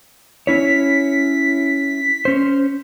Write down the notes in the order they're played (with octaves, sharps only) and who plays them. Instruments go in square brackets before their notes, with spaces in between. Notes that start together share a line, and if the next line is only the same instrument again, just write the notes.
[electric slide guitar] C#4 E4 C#5 [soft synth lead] B6
[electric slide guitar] C#4 C5